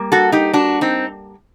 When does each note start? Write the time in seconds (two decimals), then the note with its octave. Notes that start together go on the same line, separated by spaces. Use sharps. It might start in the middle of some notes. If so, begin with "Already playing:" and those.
Already playing: G3 A#3
0.12 F#4 A4
0.32 D#4 G4
0.53 D4 F#4
0.81 C4 D#4